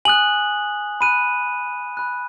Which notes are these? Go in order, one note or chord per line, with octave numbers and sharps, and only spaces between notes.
G#5 D#6 F#6 F#7
B5 F#6 D#7
B5 F#6